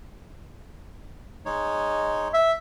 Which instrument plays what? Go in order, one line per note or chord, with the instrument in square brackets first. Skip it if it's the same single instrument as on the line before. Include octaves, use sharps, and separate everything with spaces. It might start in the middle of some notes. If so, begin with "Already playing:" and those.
[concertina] G#3 D#4 C#5
[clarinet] E5